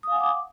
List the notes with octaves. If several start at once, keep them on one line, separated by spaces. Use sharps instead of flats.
F5 F#5 G#5 D6 D#6